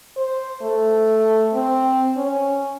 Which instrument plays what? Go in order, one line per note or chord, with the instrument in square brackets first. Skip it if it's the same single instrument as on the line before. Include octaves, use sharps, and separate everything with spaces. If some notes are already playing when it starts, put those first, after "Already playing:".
[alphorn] C5
A3
C4
C#4